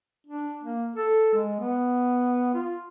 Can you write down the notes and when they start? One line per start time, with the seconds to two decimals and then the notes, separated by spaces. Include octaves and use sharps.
0.27 D4
0.63 A#3
0.96 A4
1.34 G#3
1.60 B3
2.54 F4